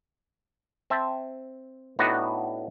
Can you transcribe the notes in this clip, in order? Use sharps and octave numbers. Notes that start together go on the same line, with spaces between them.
C4 E5 A5
A2 B3 D4 D#4 F#4